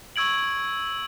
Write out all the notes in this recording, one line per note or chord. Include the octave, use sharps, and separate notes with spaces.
C#6 E6 G#6 D7 F#7